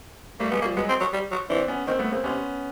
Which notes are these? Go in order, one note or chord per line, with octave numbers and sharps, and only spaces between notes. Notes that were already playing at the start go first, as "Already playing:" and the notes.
G3 A3 A#3
F#3 G#3 B3
F3 G3 A#3
F#3 G#3 B3
C4
F#3
G3
F#3
E3 C4 D4
B3 C#4
D#3 A#3 C4
D3 A3 B3
C#3 A#3 C4
C3 B3 C#4